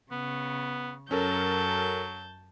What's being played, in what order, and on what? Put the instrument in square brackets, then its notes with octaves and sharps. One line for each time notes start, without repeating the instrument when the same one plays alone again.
[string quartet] C#3 [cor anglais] B3
[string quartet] F#2 A5 G6 [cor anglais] F#3 [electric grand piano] C#4 A4 A#4